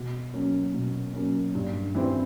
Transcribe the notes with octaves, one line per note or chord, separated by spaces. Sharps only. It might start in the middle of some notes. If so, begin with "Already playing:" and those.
Already playing: B2
F#3 A#3 C#4
B2
F#3 A#3 C#4
G2
E3 G3 C4